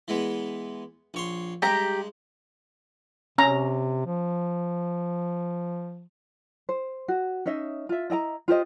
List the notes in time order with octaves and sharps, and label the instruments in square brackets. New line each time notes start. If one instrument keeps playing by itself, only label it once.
[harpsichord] E3 G#3 B3
A#1 C#5 C6
[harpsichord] G2 G#3 [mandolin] G4 G5 A#5
[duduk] C3 [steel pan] C#4 A#5
[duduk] F3
[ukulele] C5
F#4
C#4 D#4 D#5 E5
F4 E5
E4 D#5 G5 A#5
F4 G4 C5 D#5